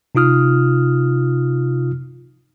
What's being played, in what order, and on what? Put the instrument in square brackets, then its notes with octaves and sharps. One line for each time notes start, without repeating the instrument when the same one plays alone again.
[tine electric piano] C3 D#4 F4 D#6 F6